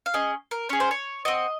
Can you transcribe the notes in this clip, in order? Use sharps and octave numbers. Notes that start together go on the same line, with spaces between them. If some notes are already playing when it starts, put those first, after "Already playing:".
F5
C#4 G#4 D#5
A#4
C#4 G#4 C#5
C5
C#5
C4 F#4 D#5